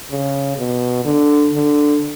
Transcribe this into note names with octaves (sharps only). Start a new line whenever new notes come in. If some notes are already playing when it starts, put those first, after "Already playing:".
C#3
B2
D3
D3